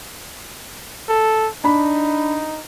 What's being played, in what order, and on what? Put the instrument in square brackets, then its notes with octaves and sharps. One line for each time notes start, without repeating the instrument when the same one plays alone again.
[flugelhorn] A4
[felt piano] D4 B5 [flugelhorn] D#4